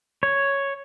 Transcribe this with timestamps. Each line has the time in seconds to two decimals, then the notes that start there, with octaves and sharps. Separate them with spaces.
0.23 C#5